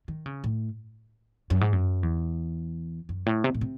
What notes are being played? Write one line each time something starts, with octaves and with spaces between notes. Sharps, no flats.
D#3
C#3
A2
F#2
G#2
F#2
E2
F#2
A2
C3
A2
C3